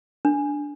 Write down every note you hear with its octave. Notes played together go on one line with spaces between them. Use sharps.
D4